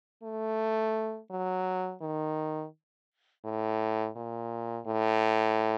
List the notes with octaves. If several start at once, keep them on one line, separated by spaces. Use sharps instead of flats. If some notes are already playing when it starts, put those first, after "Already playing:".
A3
F#3
D#3
A2
A#2
A2